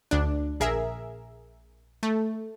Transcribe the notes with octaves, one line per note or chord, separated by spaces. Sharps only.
D2 D4
A#1 G#4 A#4 E5
A3